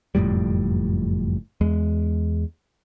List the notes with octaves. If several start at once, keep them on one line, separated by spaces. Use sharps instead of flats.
F#1 F2 A2 G3
E2 G#3